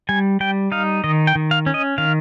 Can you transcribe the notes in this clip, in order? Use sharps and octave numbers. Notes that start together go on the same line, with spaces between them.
G3 G#5
G3 G5
D#4 F5
D#3 D#5
G5
D#3
F5
C#4
D#5
D#3 F5